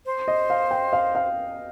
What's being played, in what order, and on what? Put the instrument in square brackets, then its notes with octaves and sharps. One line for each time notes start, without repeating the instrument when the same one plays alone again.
[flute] C5
[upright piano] D#5
F5
G5
F5
F5